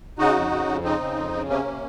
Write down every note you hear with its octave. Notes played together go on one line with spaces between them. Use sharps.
C#3 D#4 F#4
F2
C#3
F2
C#3 C4 D#4
C#3
F2
C#3
C3 A#3 C#4
C3